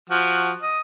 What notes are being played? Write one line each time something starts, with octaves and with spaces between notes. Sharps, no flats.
F3 F#4
D#5